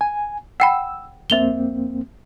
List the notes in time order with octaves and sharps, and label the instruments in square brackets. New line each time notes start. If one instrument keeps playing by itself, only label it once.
[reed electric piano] G#5
[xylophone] F#5 G5 B5 [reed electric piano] E6
[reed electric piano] F2 A#3 C4 [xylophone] E5 F7 G7